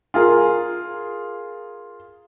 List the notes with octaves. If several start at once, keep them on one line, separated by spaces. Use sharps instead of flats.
F4 G#4 A#4